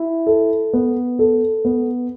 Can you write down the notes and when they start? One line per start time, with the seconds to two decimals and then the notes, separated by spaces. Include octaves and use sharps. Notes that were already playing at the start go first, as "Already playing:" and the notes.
Already playing: E4
0.27 A4
0.73 B3
1.19 A4
1.65 B3